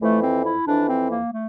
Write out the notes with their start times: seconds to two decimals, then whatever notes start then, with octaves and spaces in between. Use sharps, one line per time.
0.01 F2 E3 A3
0.23 C4
0.45 E4
0.67 F2 E3 D4
0.89 C4
1.11 A#3
1.33 A3